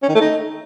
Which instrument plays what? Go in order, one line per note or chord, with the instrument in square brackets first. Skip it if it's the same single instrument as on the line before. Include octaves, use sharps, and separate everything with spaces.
[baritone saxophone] C#4
D#3
A3
D#4